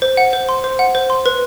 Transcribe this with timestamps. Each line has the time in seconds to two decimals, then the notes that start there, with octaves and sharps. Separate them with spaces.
0.02 C5
0.17 F#5
0.33 C5
0.49 C6
0.64 C5
0.79 F#5
0.95 C5
1.10 C6
1.26 B4